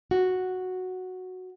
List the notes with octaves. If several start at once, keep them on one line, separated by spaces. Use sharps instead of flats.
F#4